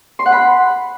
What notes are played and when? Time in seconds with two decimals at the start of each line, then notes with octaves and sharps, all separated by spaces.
0.19 C6
0.26 F#5
0.32 B5